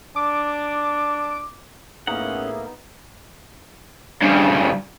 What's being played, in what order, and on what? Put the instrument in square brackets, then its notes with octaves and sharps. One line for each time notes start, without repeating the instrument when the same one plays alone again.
[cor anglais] D4 [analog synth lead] D6
[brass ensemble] A2 G#4 E5 [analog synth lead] A#3 [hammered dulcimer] B3 D#4 [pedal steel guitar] C#4 F#5
[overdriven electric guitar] G2 C#3